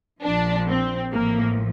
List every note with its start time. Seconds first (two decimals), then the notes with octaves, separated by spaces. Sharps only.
0.23 A#1 A#2 F3 D4
0.68 C4
1.12 A1 A2 F3 A#3